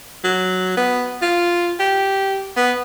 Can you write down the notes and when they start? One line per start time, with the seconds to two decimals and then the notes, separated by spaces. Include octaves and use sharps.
0.24 F#3
0.77 B3
1.22 F4
1.80 G4
2.57 B3